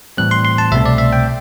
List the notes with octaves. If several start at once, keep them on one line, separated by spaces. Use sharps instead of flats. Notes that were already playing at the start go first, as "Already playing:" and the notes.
A2 E3 G3 C4 F#6
C6
C6
A5
C2 B2 A3 C4 E5
D5
E5
G5